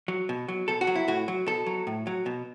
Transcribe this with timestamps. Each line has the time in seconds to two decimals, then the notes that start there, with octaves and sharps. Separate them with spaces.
0.08 F#3
0.29 B2
0.48 F#3
0.68 B2 A4
0.81 F#4
0.87 F#3
0.96 E4
1.08 A2 F#4
1.28 F#3
1.46 B2 A4
1.66 F#3
1.87 A2
2.07 F#3
2.26 B2